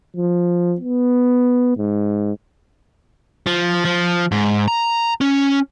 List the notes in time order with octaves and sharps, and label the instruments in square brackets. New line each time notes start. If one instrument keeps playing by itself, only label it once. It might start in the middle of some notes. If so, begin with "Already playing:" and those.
[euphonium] F3
B3
G#2
[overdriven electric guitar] F3
F3
G#2
A#5
C#4